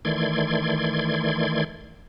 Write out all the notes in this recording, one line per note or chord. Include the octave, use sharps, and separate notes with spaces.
D#3 E3 A3 D5 C6 G#6